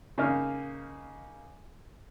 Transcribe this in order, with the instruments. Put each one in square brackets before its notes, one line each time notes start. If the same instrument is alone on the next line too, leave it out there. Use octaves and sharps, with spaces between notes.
[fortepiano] C#3 A#3 D#4 F6